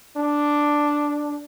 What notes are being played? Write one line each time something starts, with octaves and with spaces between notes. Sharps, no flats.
D4